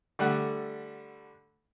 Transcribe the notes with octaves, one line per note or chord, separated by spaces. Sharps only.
D3 G3 A3 F#5